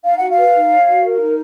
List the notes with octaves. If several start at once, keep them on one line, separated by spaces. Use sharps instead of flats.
D#4 F5
F#4 F#5
F5
B4
D#4
C#5
F#4
A#4
D#4